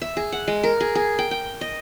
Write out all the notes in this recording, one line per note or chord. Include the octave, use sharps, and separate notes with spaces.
E5
G#4
F#5
G#3
A#4
G#4
G#4
G5
G5
D#5